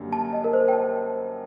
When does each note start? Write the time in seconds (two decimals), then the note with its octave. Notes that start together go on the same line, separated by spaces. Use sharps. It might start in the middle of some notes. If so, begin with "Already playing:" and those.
Already playing: F#2 D3 G3 A#3
0.13 A5
0.33 D#5
0.44 A#4
0.53 C5
0.68 G5
0.73 A5